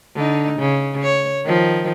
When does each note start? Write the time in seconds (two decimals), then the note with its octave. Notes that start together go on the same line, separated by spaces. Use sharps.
0.15 D3 D#4
0.59 C#3
1.03 C#5
1.44 D#3 F3